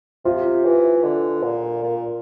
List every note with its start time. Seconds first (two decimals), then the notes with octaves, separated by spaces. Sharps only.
0.25 C3 F4
0.65 E3
1.04 D3
1.43 A#2
1.83 A#2